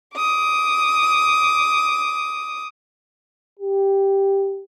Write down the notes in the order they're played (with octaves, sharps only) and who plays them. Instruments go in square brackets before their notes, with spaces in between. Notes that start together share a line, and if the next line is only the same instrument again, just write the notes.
[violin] D6 D#6
[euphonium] G4